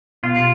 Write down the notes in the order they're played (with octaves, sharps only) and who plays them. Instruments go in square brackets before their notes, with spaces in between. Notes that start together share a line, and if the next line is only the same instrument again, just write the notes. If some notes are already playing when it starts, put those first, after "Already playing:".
[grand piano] B2 [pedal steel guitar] F4